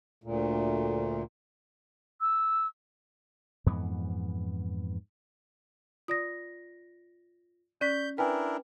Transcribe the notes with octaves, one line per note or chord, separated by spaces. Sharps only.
D2 A#2
E6
F2 G#2 E3 B3
F4 D5 D#6 A#6
C#4 D5 C#6 F#6 G6 B6
D4 E4 A#4 B4 G5 G#5